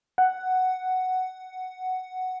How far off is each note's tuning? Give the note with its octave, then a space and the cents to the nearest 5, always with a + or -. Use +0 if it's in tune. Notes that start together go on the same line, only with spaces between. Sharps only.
F#5 +5